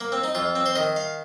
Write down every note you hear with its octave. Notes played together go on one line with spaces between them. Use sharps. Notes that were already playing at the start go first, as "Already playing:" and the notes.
A#3
C4
D#4
F2 F4
C4
C5
D#3 D#5
F5